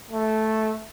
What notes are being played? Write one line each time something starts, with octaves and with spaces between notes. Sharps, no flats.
A3